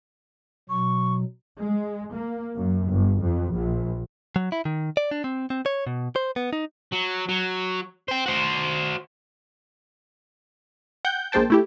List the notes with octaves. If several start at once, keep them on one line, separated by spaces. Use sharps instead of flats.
B2 F#3 C#6
G#3
A#3
F#2
G1
F2
A#1
F#3
E4
D#3
D5
D4
C4
C4
C#5
B2
C5
B3
D#4
F#3
F#3
C5 G5
F#4 C5
F#5 G5 G6
A#1 G#3 A#3 C5 G5 A5
A3 E4 G4